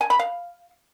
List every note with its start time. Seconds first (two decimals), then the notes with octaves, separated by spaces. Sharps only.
0.01 G#5
0.10 B5
0.19 F5